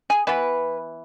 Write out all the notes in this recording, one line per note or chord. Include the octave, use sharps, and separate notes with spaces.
G#4
E3 B3 B4